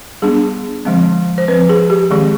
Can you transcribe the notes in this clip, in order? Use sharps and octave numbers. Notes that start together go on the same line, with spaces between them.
G3 B3 D4 G#4
D3 F3 G#3 C4
C5
F3 C4 B4
G#4
G4
D#3 G#3 C4 G#4